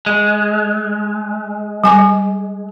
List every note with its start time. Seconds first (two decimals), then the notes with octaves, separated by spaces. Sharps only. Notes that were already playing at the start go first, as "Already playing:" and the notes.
0.06 G#3
1.84 G3 G#5 D6